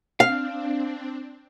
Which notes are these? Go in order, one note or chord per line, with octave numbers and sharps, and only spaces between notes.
C4 D4 F5